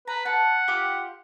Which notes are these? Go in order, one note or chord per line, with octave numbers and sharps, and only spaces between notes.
B4 A#5
F#5 A5
F4 G4 D6